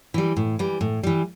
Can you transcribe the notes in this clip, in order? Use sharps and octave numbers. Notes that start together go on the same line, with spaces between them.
E3 G3
A2
E3 G3
A2
E3 G3